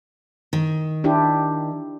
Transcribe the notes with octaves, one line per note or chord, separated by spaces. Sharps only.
D#3
D4 E4 G4